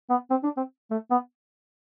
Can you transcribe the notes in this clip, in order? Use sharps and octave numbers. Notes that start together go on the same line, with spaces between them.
B3
C4
D4
C4
A3
B3